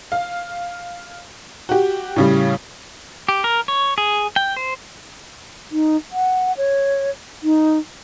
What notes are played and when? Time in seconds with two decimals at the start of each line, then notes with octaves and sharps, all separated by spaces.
0.12 F5
1.69 F#4 G4
2.16 A2 C#3 G3
3.29 G4
3.44 A#4
3.68 C#5
3.98 G#4
4.36 G5
4.56 C5
5.72 D#4
6.12 F#5
6.57 C#5
7.43 D#4